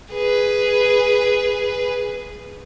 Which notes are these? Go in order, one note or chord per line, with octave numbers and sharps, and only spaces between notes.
G#4 B4